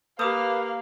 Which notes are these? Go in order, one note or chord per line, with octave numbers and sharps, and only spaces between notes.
A#3 G4 B4 F5 D6 D#6